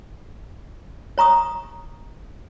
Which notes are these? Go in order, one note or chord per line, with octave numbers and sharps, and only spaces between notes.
C#5 A#5 C#6 D#6